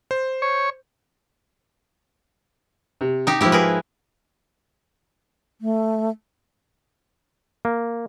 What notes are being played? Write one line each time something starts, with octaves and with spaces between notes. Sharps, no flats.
C5
C#5
C3
D#4 G4
G#2 F3 E4 G4
G#4 A#4 B4
A3
A#3